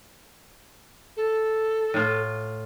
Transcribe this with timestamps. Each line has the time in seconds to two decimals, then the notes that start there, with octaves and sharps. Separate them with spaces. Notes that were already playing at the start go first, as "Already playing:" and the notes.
1.17 A4
1.94 A2 F4